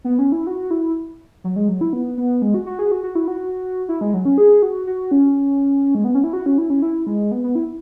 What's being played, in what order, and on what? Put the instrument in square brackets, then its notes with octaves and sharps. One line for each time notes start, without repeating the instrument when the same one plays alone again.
[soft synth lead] B3
C#4
E4
F#4
E4
F#3
G#3
F#3
E4
B3
B3
G#3
F#4
F#4
G#4
F#4
F#4
E4
F#4
E4
G#3
F#3
C#4
G#4
F#4
F#4
C#4
G#3
B3
C#4
E4
F#4
C#4
E4
C#4
E4
G#3
B3
B3
E4